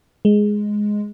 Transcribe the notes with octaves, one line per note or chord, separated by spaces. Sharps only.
G#3